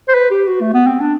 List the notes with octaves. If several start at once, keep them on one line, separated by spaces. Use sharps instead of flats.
C5
B4
G4
F#4
A3
B3
C4
D4